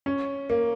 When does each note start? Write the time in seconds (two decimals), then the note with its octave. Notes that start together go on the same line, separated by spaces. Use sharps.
0.06 C#4
0.50 A#3